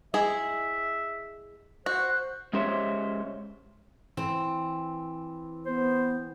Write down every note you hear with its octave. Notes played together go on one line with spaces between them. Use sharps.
G#3 E4 G#4 E5
F#4 C5 F#6
G#3 C#4 G4 C5 C#5 E5
E3 C4
B3 C5